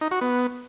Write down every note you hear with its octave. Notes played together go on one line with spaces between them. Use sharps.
D#4
F#4
B3